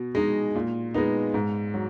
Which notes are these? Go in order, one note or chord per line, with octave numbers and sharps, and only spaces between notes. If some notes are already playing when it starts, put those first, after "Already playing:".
Already playing: B2
G#3 D#4
A#2
G#3 B3 D#4
G#2
F#3